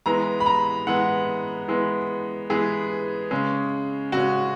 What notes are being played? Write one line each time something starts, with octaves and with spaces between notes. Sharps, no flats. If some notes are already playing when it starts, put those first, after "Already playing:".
E3 G#3 B3 A#5
B5
A#5
E3 G#3 B3 F#5
E3 G#3 B3
E3 G#3 B3 G#4
C#3 G#3 C#4
C#3 G#3 C#4 F#4